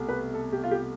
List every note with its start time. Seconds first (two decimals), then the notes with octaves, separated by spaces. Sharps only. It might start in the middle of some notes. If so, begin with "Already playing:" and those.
Already playing: C2 B2 A3
0.09 B4
0.34 A4
0.53 G4
0.64 F4
0.71 G4